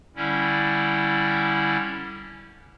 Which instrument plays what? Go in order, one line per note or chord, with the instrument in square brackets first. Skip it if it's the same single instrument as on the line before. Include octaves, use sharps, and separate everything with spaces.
[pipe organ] D3 G3 C#4 E4